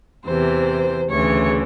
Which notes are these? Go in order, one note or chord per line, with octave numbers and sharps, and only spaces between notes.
E2 C3 E3 C5
D2 C#3 E3 C#5